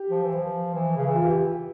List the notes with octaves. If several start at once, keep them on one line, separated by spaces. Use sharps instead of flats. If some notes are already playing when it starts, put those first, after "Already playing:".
Already playing: G4
F3
E3
F3
E3
C#3
E3
F4
G4